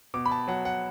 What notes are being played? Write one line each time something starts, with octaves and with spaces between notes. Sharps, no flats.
B2 D6
B5
A5
F#3 F#5
F#5